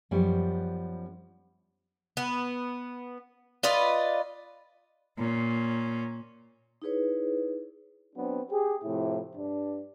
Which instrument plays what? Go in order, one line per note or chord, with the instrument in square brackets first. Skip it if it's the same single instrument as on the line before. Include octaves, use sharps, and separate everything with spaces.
[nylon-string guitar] F#2 F3 G3 B3
[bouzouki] B3
F4 B4 D5 D#5
[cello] A#2 C#4
[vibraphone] D#4 E4 G#4 B4 C#5
[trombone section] F#3 B3 C4 D4
G4 G#4
A2 C3 F3 E4
G2 D4